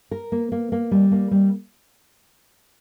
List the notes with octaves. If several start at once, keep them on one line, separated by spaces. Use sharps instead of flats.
A#4
A#3
A#3
A#3
G3
A#3
G3